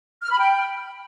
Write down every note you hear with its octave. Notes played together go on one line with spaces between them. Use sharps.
F6
B5
G5